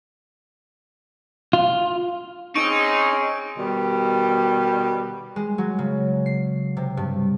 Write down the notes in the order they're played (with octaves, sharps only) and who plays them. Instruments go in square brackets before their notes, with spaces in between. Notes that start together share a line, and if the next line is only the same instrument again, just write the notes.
[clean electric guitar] F4
[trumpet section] C4 C#4 G#4 [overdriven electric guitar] D#4 [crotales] C#6 D7
[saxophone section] B2 D#3 G3
[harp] G#3
F#3
C#3
C7
C3
G2